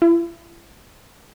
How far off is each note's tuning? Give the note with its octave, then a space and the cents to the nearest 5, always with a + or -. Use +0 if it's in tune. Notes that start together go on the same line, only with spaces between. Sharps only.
E4 +35